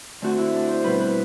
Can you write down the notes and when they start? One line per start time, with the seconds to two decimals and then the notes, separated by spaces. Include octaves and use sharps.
0.22 D3 A3 C4 F#4
0.38 E4
0.54 D4
0.69 C5
0.84 B2 G3 C4 B4
1.00 B4